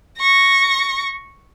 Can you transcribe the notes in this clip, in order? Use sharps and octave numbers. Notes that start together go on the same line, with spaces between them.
C#6 A#6